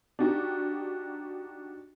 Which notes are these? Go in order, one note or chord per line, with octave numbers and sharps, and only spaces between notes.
D4 D#4 F#4 G4